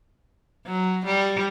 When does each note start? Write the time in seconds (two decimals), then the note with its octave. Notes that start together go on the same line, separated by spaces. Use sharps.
0.66 F#3
1.05 G3